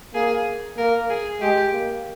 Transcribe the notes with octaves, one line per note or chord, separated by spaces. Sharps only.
A#3 G#4
A#3 A#4
G#4
G#3 G4
A#3